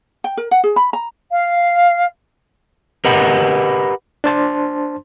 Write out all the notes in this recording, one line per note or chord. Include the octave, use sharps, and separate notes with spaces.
G5
A#4
F#5
G#4
B5
A#5
F5
G4 A#4 B4 D#5 F#5
D4 C5 A5 C6